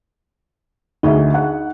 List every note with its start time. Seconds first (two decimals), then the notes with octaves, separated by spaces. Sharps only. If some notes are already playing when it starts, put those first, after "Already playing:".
1.03 D2 D#4 G#4 E5
1.34 F#5